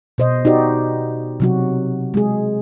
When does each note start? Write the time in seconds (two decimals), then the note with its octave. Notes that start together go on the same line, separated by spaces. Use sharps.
0.18 B2 C5 D#5
0.45 D#4 F#4 G4 D5
1.40 C3 F#3 F#4
2.14 G#3 G#4